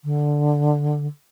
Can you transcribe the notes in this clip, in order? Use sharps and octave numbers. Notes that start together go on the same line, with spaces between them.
D3